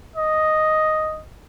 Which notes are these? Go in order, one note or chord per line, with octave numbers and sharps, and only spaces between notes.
D#5